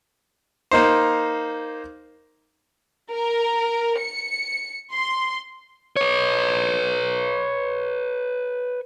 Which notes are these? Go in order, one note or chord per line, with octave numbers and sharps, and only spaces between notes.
A#3 D#4 C5
A#4
C#7
C6
B4 C#5